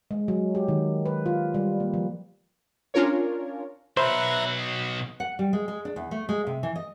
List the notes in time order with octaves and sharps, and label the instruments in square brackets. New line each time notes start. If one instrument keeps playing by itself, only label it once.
[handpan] G#3
F#3
G4
D#3
B4
F4
G3
A#3
F3
[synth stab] C#4 D4 F4 A#4 C#5
[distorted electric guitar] B1 F#4 [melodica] B4 E5 A#5 [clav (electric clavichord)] C5
[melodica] D#5
[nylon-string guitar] F#5
G3
G#3
G#3
D4
E2
A3
G#3
C3
E3
D#5